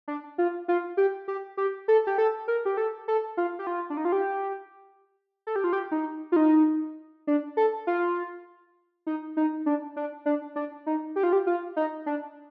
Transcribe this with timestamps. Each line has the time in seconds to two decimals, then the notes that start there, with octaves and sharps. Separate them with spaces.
0.08 D4
0.38 F4
0.68 F4
0.97 G4
1.28 G4
1.57 G4
1.88 A4
2.07 G4
2.18 A4
2.48 A#4
2.65 G4
2.77 A4
3.08 A4
3.37 F4
3.59 G4
3.67 F4
3.90 D4
3.97 D#4
4.05 F4
4.12 G4
5.47 A4
5.56 G4
5.64 F4
5.73 G4
5.91 D#4
6.32 F4
6.36 D#4
7.27 D4
7.57 A4
7.87 F4
9.07 D#4
9.37 D#4
9.66 D4
9.96 D4
10.26 D4
10.56 D4
10.86 D#4
11.16 G4
11.23 F4
11.33 G4
11.47 F4
11.76 D#4
12.06 D4